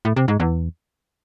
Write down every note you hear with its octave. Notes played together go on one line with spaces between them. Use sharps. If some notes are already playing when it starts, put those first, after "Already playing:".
A2
C3
G#2
E2